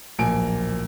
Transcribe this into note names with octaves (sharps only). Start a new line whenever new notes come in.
D1 A#1 A#3 G#5 D7